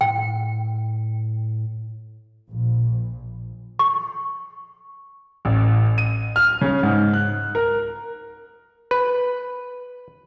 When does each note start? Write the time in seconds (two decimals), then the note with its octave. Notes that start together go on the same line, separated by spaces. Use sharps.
0.01 A2 G5
2.49 A#1
3.79 C#6
5.45 A1
5.98 D#7
6.36 F6
6.61 C#3
6.83 G#2
7.14 F#6
7.55 A#4
8.91 B4